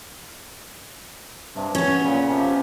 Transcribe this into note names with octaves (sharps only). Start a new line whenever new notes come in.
G2 C3
B3 C#4 C#5
A#2 C#3
C3 F3